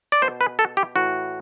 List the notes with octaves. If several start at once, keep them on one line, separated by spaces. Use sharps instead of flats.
D5
B2 C5
B4
A4
G4
A2 E3 F#4